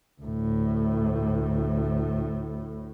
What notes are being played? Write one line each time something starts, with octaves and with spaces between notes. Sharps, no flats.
D2 A2